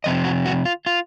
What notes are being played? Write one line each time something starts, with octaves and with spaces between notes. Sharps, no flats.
F2 C3 F3 D#5
F#4
F#4
F4
F4